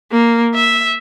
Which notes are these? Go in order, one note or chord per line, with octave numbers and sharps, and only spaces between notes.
A#3
E5